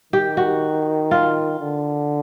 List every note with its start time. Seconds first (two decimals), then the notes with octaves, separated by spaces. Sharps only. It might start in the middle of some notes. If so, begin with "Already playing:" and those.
0.13 D#3 G4
0.37 F#4
1.11 F4
1.60 D3